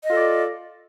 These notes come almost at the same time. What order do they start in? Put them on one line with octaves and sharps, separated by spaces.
D#5 F4 A4 D5